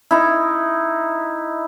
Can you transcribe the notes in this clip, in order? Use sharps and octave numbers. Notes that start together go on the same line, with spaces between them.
D#4 E4